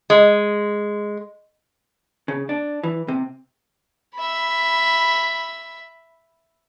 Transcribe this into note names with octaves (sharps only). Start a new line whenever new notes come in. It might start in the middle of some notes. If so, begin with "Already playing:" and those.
G#3
C#3
D4
E3
C3
E5 B5